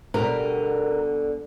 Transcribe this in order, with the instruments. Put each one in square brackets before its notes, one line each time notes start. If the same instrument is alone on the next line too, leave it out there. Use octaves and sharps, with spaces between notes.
[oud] B2 D3 G3 [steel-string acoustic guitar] A#4